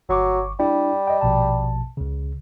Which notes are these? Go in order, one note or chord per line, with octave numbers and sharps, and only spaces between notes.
G1 F#3 C#6 D6
G3 D4 E4
D#5 G5
A#1 B2 A5
C#2 C#3